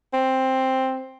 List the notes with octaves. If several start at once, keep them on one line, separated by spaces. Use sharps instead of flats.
C4